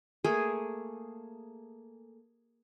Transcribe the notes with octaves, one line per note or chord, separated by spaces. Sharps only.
A3 A#3 G#4